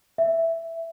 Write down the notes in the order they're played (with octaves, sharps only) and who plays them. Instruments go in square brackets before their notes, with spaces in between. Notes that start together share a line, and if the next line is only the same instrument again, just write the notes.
[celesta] E5